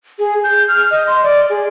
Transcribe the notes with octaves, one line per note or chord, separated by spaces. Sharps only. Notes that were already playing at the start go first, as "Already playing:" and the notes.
G#4
G6
F6
D#5
C6
D5
G#4